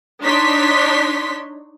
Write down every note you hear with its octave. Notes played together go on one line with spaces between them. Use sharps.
D4 D#4 C#5 C6 B6